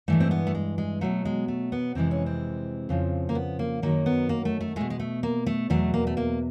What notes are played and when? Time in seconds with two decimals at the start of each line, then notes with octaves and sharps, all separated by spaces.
0.08 G2 E3 G#3 A3
0.20 C4
0.31 B3
0.47 A3
0.55 G#3
0.78 G#3
1.01 B2 F#3 A3
1.25 G#3
1.48 A3
1.72 B3
1.95 F2 C3 E3 G#3 C4
2.11 C#4
2.26 C4
2.89 F2 C#3 F3
3.29 A#3
3.35 B3
3.59 A#3
3.82 F#2 D#3 F#3 A#3
4.06 B3
4.29 A#3
4.45 A3
4.60 A3
4.76 B2 G#3 A3
4.90 G#3
4.99 A3
5.23 A#3
5.46 A3
5.70 E2 B2 F#3 A3
5.94 A#3
6.07 A3
6.17 A#3